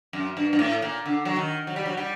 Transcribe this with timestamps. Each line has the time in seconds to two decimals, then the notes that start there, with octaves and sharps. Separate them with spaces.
0.13 F#2
0.37 G2
0.53 G2
0.59 A2
0.82 A#2
1.06 D3
1.25 F#3
1.36 D#3
1.67 F#3
1.76 G3
1.86 F#3
1.97 G3